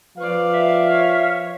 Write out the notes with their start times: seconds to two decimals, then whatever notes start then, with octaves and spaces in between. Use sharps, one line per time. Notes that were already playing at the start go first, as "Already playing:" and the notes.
0.17 F3 B4 D5 F5
0.54 E5
0.91 C#5